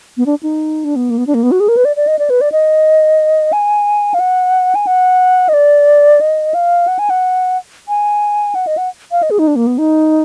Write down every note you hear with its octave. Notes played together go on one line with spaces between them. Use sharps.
B3
D4
D#4
D4
B3
A#3
B3
D4
A#3
B3
F#4
G#4
A#4
B4
D5
D5
D#5
D5
B4
D5
D#5
G#5
F5
F#5
G#5
F#5
D#5
D5
D#5
F5
F#5
G#5
F#5
G#5
F#5
D#5
F#5
F5
D#5
G#4
D#4
D4
A#3
B3
D#4